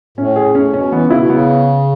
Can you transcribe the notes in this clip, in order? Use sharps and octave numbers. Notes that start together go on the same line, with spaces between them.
A2 C#4
G#4
A2 C#4
B2 C#4
E3 B3
C#3
E4
B2
C#3 B3